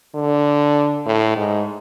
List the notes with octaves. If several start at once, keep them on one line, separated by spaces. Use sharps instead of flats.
D3
A2
G#2